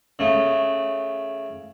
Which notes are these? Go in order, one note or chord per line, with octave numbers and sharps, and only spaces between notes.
C#3 A3